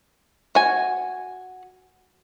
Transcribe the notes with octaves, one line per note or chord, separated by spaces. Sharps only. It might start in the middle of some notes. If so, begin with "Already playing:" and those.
F#4 G#5